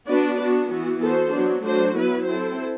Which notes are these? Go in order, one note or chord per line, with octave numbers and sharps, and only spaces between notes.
B3 D4 F#4 B4 D5
B3 D4 F#4
E3 B3 F#4
B3 F#4 A4 C5
F#3 B3 D4 F#4
F#3 A3 D4 F#4 C5
F#3 B3 E4 B4
C4 E4 A4 C5